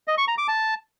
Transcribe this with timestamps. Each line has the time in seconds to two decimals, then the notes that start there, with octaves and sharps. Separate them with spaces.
0.08 D#5
0.18 C#6
0.28 A#5
0.38 D6
0.48 A5